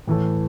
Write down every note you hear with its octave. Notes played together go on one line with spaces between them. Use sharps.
A2 E3 A3